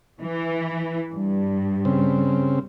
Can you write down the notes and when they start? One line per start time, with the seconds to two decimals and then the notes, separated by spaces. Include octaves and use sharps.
0.21 E3
1.13 G2
1.85 C#3 C4